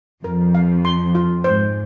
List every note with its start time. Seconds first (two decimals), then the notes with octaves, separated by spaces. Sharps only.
0.24 F2 A#4
0.55 F5
0.85 C6
1.15 F4
1.44 G#2 C5